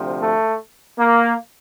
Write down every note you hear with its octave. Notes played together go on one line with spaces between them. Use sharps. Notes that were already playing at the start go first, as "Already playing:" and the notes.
Already playing: D2 C3 F3
A3
A#3